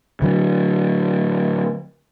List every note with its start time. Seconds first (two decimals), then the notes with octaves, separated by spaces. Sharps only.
0.22 D3 F#3